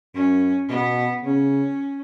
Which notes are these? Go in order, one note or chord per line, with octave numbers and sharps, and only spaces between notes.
F#2 C#4
B2 B3
C#3 C#4